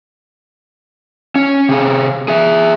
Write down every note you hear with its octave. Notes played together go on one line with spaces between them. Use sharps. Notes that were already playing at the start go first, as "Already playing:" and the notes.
C#4
C3 G#4
G#4 E5